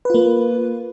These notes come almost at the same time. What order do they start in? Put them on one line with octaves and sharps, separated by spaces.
B4 F4 A#3